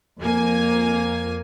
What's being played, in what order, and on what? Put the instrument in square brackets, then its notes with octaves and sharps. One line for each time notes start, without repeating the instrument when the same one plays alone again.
[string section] F2 A#3 G#5